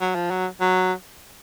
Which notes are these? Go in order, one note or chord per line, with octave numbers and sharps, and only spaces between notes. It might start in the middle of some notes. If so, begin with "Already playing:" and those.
F#3
F3
F#3
F#3